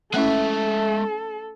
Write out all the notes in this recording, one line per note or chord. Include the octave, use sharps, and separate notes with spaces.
G#3 A3 C#4 E4 A4 E5